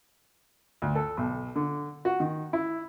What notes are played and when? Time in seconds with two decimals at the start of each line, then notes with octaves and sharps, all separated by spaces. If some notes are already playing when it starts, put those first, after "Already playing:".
0.82 D2
0.95 A4
1.17 B1
1.56 D3
2.05 F#4
2.20 D#3
2.53 E4